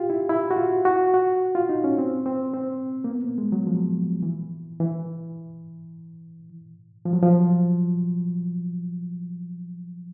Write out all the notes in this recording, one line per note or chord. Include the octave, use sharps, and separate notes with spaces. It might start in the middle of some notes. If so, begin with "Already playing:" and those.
Already playing: F4 G4
E4
E4
F#4
F4
F#4
F#4
F4
D#4
C#4
C4
C4
C4
A#3
B3
A#3
G#3
F#3
F3
E3
E3
F3
F#3
F3